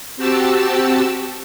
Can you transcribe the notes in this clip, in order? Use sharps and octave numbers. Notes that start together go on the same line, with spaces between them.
C4 F#4 G4 A5 E6